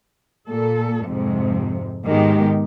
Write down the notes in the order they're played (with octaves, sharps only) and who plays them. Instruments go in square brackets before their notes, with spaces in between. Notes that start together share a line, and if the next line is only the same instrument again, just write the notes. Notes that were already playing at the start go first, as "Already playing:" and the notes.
[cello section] A#2 A4
F2 G#2 C3
G#2 D#3 G#3 B3 G4